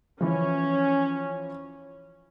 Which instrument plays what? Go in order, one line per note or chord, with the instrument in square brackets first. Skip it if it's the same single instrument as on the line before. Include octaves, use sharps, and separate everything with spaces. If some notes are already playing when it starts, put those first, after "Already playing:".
[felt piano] E3 F3 [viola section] C#4